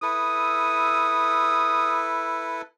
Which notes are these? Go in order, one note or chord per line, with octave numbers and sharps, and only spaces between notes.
E4 A4 B4 D#6